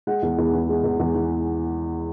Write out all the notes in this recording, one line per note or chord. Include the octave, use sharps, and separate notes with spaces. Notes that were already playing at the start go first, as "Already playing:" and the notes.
G#3 F#5
E2
E2
E3
G#3
E2
E2
E3